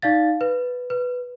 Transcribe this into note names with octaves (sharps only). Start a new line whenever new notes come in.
D#4 D5 F5 A6
B4
B4